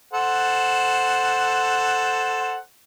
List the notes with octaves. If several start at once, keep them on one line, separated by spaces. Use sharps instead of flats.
A4 C5 F#5